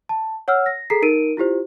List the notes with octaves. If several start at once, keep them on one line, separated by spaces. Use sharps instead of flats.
A5
C#5 F#5 E6 F6
A#6
G#4 A4 A#5 B6 C7
D#4 A#4 D7 D#7
E4 F4 G4 C5